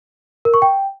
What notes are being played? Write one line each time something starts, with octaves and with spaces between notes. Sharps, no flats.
A#4
C#6
G5